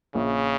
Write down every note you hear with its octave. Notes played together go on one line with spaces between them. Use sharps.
A#1 C#3